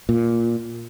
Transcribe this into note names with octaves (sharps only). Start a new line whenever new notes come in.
A#2